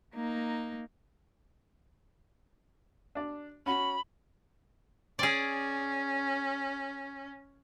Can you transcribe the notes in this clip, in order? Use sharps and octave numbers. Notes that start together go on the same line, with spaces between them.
A#3 D#4
D4 D5
C#4 F#4 B5
C#4 G#4 D5